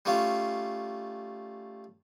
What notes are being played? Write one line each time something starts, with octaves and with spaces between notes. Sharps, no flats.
G3 A3 C#4 F4 F5